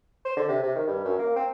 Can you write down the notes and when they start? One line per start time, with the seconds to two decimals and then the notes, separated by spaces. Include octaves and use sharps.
0.25 C5
0.37 D3
0.48 C3
0.63 C3
0.76 D#3
0.87 G2
1.04 F#2
1.19 A#3
1.36 C4